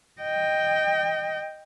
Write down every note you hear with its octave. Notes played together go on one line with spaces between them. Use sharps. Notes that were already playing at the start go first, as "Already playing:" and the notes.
D#5 G5